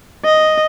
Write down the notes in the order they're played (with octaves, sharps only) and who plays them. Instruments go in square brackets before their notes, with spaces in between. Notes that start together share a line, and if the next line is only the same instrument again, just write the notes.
[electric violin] D#5